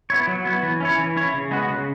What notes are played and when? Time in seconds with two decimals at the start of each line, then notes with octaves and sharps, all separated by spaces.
0.10 B3 E4 C#5
0.27 F#3
0.45 B3 E4 C#5
0.63 E3
0.80 C#4 E4 C#5
0.98 E3
1.16 C#4 E4 C#5
1.34 C#3
1.51 G#3 B3 F#4
1.70 C#3